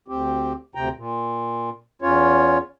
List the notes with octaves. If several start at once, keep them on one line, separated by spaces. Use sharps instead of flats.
D2 C4 G4
D2 C3 G5 A#5
A#2
E2 C#4 F4 C#5